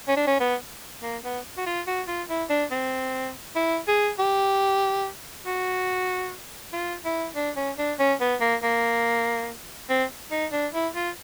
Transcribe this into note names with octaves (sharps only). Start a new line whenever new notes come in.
C#4
D4
C#4
B3
A#3
B3
F#4
F4
F#4
F4
E4
D4
C4
E4
G#4
G4
F#4
F4
E4
D4
C#4
D4
C#4
B3
A#3
A#3
C4
D#4
D4
E4
F4